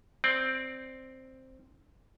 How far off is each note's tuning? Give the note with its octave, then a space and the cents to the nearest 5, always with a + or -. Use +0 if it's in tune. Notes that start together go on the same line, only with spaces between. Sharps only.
C4 +0 D5 +0